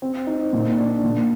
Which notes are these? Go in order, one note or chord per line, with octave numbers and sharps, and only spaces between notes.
C4
D#4
A#2
D4
A#2